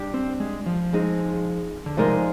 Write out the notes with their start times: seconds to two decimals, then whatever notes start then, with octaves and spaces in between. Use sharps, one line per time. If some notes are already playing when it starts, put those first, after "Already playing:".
Already playing: G3 D4 G4
0.14 C4
0.40 G#3
0.66 F3
0.93 G#3 C4 D#4 G#4
1.86 D3
1.97 C3 F3 G#3 D#4 A#4 D5